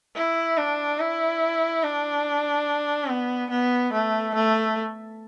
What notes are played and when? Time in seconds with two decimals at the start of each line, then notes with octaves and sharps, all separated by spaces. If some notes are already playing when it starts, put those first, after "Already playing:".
0.16 E4
0.57 D4
1.00 E4
1.83 D4
3.09 B3
3.51 B3
3.93 A3
4.35 A3